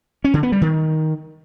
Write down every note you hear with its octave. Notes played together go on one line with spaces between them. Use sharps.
C#4
D3
B3
G3
D#3